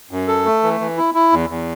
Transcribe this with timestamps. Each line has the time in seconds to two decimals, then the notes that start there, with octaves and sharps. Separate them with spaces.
0.11 F#2
0.28 A4
0.46 A3
0.63 E3
0.80 E3
0.98 E4
1.14 E4
1.32 E2
1.50 E2